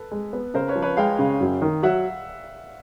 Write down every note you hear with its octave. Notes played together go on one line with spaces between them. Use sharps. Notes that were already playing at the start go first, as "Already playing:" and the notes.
Already playing: A4 B4
G#3
B3
C#3 A#4 C5
B4 C#5
F3
B4 C#5
G#3 F5 G5
C#3
F#2
D#3
F#3 E5 F#5